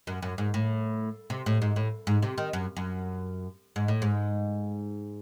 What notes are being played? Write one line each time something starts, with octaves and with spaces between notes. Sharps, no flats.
F#2
F#2
G#2
A2
C3
A2
G#2
A2
G#2
C3
D#3
F#2
F#2
G#2
A2
G#2